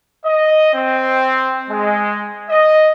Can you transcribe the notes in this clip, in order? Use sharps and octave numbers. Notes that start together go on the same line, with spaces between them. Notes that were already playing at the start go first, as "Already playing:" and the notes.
D#5
C4
G#3
D#5